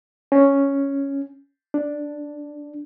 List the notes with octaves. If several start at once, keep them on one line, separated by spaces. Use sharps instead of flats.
C#4
D4